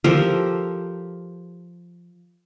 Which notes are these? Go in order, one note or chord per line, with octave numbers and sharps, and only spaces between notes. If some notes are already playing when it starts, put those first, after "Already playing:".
F3 G4 A4 A#4